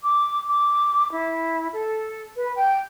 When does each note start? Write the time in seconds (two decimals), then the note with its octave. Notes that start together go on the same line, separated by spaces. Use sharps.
0.03 D6
0.49 D6
1.12 E4
1.72 A4
2.36 B4
2.56 G5